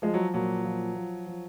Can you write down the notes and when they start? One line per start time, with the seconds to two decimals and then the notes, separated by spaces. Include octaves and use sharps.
0.02 F3 G#3
0.14 F#3
0.34 A#2 F#3
0.64 F3
0.95 F3
1.27 F3